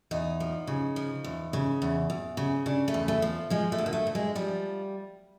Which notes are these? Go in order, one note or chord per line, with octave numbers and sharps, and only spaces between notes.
E2 D#4
F3
C#3
F3
E2
C#3
E2
E2
C#3
C#3 D4
A3
E2
A3
F3
F3 G#3
A3
D2
A#3
A3
D2
G#3
F3 G3